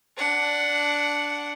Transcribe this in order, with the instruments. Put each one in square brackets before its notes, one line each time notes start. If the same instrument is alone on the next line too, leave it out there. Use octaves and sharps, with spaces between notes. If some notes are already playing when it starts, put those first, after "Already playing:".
[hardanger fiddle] D4 F#5